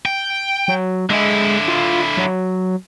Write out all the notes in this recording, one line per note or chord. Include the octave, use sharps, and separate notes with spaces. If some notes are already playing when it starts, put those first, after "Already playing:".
G5
F#3
D3 G#3 E4
F4
F#3